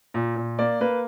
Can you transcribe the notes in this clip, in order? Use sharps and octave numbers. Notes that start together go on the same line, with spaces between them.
A#2
A#2
A#3 D5
A#3 B4